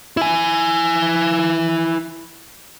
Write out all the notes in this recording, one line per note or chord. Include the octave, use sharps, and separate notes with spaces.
E4 G#5